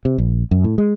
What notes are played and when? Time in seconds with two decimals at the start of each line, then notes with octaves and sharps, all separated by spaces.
0.05 C3
0.18 A#1
0.51 F#2
0.64 A2
0.78 G#3